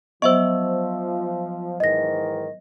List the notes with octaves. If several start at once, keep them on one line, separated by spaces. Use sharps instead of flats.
F3 F#3 B3 C5 D#5 E5 C#6 E6
G#2 D#3 E3 D#5 A#6